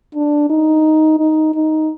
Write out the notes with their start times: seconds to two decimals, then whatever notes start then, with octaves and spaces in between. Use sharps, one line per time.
0.15 D4
0.50 D#4
1.20 D#4
1.55 D#4